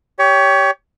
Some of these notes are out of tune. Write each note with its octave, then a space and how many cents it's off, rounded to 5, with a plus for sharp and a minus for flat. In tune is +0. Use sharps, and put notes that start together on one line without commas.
G4 +0 C#5 +25